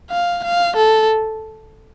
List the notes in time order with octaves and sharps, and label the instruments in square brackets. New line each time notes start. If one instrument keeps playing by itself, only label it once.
[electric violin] F5
F5
A4